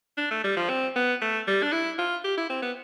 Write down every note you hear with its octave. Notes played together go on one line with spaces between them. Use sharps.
D4
A3
G3
F3
C4
B3
A3
G3
D4
E4
F4
G4
E4
C4
B3